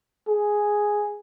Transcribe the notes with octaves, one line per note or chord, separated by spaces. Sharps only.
G#4